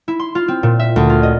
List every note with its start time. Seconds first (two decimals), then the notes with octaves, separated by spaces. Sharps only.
0.08 E4
0.19 C6
0.35 F4
0.48 C4
0.63 A#2
0.79 E5
0.96 D2
1.10 F4
1.23 D#5